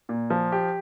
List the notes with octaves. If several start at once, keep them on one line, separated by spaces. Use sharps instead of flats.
A#2
F3
G4